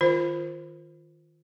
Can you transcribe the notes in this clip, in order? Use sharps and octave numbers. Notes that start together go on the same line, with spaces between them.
D#3 F4 C5